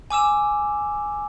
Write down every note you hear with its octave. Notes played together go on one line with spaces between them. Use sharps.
G#5 D6 E6 E7